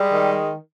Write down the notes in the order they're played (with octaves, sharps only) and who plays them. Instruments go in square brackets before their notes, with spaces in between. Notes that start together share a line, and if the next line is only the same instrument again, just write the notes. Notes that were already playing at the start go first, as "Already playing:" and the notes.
Already playing: [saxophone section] G3 [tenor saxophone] G#3
[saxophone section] D#3